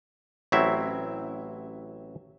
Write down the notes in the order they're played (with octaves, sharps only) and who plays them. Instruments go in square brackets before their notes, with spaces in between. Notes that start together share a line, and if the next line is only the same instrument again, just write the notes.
[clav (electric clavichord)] A1 F#3 C4 E4 E5